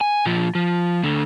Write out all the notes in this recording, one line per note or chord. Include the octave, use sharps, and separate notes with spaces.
G#5
A#2 F3
F3
D2 D3